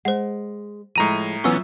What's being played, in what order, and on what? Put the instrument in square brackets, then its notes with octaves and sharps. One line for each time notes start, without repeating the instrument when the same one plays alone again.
[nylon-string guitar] G#3 [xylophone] C5 F#5
[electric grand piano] A2 A#5 D#7 [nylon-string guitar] F3 G#3
[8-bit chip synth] E3 B3 C#4 [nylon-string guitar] F#3 F4 E5 [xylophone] C#6 E6